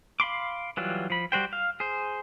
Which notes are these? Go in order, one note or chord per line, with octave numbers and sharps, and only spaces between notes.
F5 B5 C6 D6
E3 F#3 G3 F4
F3 B5
G3 F#4 C5 G5
F5
G#4 C5